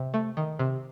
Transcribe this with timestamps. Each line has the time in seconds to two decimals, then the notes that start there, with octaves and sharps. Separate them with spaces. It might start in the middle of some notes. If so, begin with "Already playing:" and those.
Already playing: C3
0.14 A3
0.37 D#3
0.59 C3